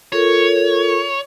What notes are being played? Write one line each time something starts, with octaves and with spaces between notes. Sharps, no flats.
F4 A4 A#4 C#5